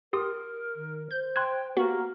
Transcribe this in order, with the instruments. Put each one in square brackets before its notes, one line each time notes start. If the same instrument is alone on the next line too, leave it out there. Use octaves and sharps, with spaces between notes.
[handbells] G4 C6 D#6 [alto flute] A#4
[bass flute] D#3
[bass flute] C5 [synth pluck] G6
[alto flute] G5 [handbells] C6 F#6 G#6
[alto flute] A#3 [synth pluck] B3 F#4 [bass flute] G4